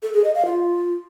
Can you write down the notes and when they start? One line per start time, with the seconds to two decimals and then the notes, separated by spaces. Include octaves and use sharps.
0.03 A4
0.13 G#4
0.24 D#5
0.35 F5
0.46 F4